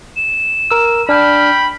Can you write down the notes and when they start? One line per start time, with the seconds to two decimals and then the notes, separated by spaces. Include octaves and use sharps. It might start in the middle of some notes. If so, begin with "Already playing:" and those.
0.16 E7
0.71 A#4 E6
1.09 D4 G5 B5 F6